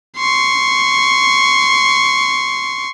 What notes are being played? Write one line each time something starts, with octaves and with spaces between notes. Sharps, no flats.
C6 C#6